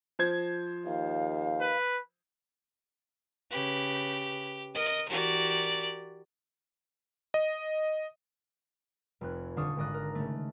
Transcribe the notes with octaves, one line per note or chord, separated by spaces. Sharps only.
F3 C5 G#6
D#2 F5
B4
C#3 G4 B4
A#4 D#5
E3 F#4 G4 A#4 D5
D#5
F1 F2 F#6
D#1 D3 D4 F5 C#6 D#6
G#1 D4 D#5 F#6
A#4
C#3 A3